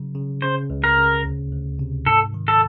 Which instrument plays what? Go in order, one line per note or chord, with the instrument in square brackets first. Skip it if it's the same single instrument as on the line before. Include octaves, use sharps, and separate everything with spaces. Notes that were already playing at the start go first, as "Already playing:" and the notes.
Already playing: [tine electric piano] C#3 F#3
C#3
[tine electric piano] C#3 [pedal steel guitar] C5
[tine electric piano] C#2
[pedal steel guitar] A#4
[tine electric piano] C#3
D2
D2
C3
[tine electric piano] G#2 [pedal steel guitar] A4
[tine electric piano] D#3
[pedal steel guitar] A4